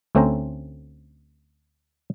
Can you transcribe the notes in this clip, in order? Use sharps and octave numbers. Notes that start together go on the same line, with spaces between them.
D2 A3 C4 C#4 C5 A#5